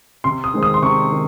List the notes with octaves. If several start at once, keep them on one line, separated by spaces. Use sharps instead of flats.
C3 C6
D#6
D#3 G#3 C4
D#6
C6
C3 C#6
D#3